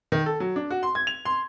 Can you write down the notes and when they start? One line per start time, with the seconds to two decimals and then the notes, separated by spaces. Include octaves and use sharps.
0.12 D#3
0.26 A4
0.40 F#3
0.56 D4
0.70 F#4
0.83 C6
0.95 G#6
1.07 F7
1.25 C6